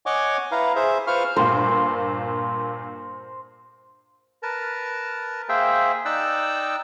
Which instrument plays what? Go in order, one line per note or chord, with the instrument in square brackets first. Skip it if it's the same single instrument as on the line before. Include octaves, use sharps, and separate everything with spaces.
[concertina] C#5 D#5 F#5 G#5 C#6 D6
E4 B4 F5 A#5
G#4 C5 E5
F4 B4 C5 F5 C#6 F6
[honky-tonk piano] G2 A#2 [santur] C5
[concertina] A#4 B4 A5
A#3 G#4 C5 E5 G5
D#4 D5 G5 E6 F#6